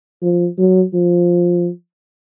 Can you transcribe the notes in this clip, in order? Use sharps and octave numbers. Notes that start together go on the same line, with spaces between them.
F3
F#3
F3